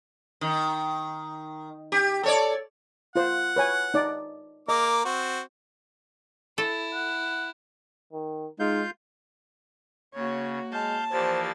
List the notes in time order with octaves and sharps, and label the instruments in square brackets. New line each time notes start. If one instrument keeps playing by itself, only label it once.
[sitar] D#3
G4
A4 C#5 D5
[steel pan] F4 C5 [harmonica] F#5
[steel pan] B4 C#5 G#5
D#4 D5
[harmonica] A#3 A#4 D6 [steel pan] D#5
[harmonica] C4 F#4
[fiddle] E4 [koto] A4
[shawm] F#5
[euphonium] D#3
[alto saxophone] G#3 [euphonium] D#4 [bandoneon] F4 F5 G6
[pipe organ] C#3 [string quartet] A#3 F#4 [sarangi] C#5
[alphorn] G#3 [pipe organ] F5 G6 [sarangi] A5
[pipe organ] E3 F3 A#3 [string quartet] G4 D5 A6 [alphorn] C5